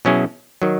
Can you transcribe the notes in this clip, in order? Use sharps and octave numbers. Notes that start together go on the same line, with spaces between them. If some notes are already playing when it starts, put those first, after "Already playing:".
B2 F#3 C#4 E4 G#4
D#3 F#3